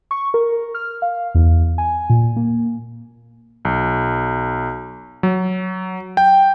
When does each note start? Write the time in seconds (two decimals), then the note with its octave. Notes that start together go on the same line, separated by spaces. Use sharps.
0.11 C#6
0.34 A#4
0.75 F6
1.02 F5
1.35 E2
1.78 G#5
2.10 A#2
2.36 A#3
3.65 B1
5.23 F#3
6.17 G5